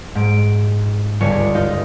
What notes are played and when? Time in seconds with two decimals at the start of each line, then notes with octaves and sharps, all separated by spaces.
0.15 G#2 D7
1.20 G1 C#2 G#4 C#5 D5 C#7
1.54 D#4 F4